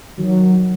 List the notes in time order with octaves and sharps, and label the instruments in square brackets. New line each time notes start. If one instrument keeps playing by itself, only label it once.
[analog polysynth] D#3 F#3